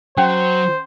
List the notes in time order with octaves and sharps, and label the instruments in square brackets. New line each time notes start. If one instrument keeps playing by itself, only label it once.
[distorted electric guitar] F#3 [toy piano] C#4 F#5 G5 [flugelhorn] C5